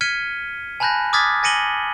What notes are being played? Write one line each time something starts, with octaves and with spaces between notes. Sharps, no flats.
F6 G#6 B6 C#7 D#7 G7
G#5 A5 B5 F#6 G6 A#6
D6 D#6 F6 G#6 A6 B6
G#5 A#6 C#7 D#7 F#7 G7